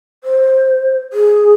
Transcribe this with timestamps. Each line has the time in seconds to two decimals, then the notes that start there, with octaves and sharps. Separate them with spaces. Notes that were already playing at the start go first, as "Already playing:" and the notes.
0.24 C5
1.13 G#4